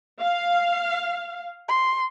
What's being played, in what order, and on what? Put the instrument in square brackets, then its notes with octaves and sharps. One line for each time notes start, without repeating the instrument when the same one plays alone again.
[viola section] F5
[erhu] C6